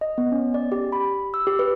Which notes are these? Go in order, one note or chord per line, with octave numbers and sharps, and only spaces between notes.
D#5
B3
C#4
D5
G4
B5
E6
G4
B4